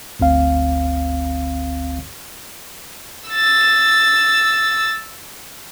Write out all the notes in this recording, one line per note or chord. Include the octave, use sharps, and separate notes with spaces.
G1 D2 C4 F5
E6 A6